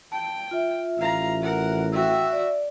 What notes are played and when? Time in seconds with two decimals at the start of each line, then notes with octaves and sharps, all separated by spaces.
0.12 G5 A5
0.51 F4 E5
0.98 A1 F5 A#5
1.42 A#4 F#5
1.92 F#4 E5 G5 E6
2.33 D5